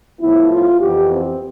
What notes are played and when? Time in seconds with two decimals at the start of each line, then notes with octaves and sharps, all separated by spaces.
0.21 A2 F3 B3 E4
0.50 F4
0.80 F2 E3 B3 G4
1.11 C4